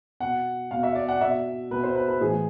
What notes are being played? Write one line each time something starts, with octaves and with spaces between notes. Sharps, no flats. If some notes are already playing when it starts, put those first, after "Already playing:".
B2 F#5
B2 F5
E5
D5
F#5
B2 E5
B2 B4
C5
B4
B4
A2 E3 G#4